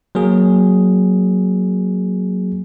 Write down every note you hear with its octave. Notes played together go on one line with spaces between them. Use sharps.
F#3 A#3 G#4